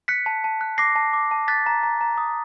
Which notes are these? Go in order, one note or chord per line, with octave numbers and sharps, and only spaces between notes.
F#6 B6 C#7
A5
A5
F#6
D6 A#6 C7
A5
D6
A5
F#6 A6 B6
A#5
A#5
A#5
D#6